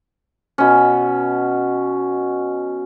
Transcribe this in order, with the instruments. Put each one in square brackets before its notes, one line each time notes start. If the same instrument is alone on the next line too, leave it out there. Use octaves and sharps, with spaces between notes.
[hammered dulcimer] B2 C#4